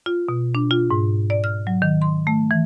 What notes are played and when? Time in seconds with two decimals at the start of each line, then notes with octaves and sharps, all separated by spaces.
0.06 F4
0.29 B2
0.55 D4
0.71 F4
0.91 G#2
1.30 D5
1.44 F6
1.67 F#3
1.82 D#3
2.02 C6
2.27 A3
2.51 E3